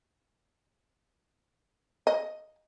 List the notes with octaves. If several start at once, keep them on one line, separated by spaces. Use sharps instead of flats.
D#5